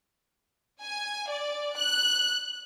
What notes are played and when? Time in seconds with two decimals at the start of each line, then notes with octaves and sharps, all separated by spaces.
0.81 G#5
1.28 D5
1.76 F#6